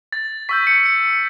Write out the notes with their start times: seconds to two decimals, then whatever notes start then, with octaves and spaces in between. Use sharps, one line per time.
0.13 A6
0.49 C#6 E6 G6 B6
0.67 C#7
0.86 C#7